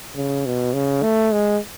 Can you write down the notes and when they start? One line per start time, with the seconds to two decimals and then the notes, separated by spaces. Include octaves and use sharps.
0.16 C#3
0.46 B2
0.74 C#3
1.03 A3
1.32 G#3